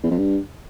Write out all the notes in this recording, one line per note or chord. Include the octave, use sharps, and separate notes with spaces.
E2
F2
G2